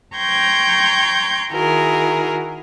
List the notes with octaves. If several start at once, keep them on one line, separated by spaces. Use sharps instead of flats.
G5 A#5 C6 C#6 G6 G#6
D#3 E4 F#4 G#4 A#4